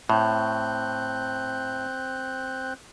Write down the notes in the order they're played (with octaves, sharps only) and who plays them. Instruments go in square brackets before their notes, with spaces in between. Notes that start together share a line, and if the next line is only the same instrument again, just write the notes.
[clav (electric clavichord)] A2 [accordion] C4 F#6 G6